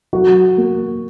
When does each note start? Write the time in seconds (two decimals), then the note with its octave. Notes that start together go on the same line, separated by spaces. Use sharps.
0.13 F#3 F#4
0.58 A#3